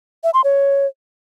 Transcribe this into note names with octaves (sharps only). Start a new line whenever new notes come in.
E5
C6
C#5